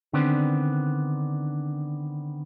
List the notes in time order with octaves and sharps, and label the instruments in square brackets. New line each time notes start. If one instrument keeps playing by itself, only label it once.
[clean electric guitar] D3 D#3 B3 C4 D4